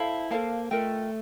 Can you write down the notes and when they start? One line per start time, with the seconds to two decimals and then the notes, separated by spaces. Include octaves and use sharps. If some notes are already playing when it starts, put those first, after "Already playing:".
Already playing: E4 A4 C5 F5 A5
0.31 A#3 A4 C5 F5 A5
0.71 A3 F4 A#4 D#5 G5